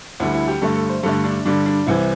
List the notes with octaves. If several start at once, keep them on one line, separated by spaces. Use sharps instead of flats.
D2 D3 G3 E4
E4
G4
G2 D3 A3 A4
A4
C5
G2 D3 A3 A4
D4
G2 D3 G3 D4
D4
C2 C3 E3 E4